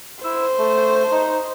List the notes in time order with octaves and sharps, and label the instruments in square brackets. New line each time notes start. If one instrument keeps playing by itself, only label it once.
[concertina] E4 E6 [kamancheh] C5
[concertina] A3
D#4